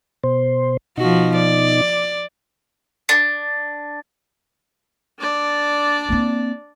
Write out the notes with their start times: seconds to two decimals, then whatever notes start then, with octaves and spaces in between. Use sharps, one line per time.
0.24 B2 C5
0.98 B2 F3 D#4 F#4
1.36 D5
3.09 D4
5.19 D4 D5
6.09 A#3 C4